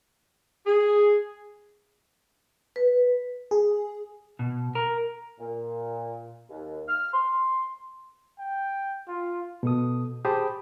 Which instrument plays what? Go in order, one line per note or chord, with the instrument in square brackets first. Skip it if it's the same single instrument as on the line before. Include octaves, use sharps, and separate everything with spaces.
[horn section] G#4
[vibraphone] B4
[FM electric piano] G#4
[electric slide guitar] B2
A#4
[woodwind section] A#2
D#2
F6
C6
[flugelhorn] G5
F4
[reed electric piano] B2 A4 D#6
G4 G#4 C5 A5 B5 D#6